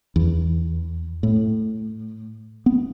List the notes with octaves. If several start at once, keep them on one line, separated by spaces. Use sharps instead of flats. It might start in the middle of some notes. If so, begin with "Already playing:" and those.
E2
A2
B3